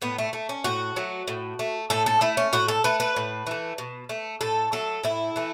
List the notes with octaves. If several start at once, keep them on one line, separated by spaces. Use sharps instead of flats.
A2 B3
A3
A3
C#4
A2 F#4
F#3 A3
A2
A3
A2 A4
A4
A3 E4
C#4
A2 F#4
A4
A3 B4
B4
A2
E3 A3
B2
A3
A2 A4
F#3 A3 A4
A2 E4
E3 A3